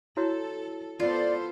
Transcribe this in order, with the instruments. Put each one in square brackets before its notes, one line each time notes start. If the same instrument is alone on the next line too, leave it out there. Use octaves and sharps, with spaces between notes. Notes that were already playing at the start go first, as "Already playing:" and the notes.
[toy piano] E4 F#4 C#5 [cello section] A4
[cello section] B3 A4 C5 [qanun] F4 [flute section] D5